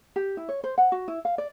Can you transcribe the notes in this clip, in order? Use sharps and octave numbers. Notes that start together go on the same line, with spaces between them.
G4
E4
C#5
C5
F#5
F#4
E4
F5
D5